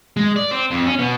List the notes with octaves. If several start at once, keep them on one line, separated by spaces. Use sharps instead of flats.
G#3
D5
C4
F2
C#4
B2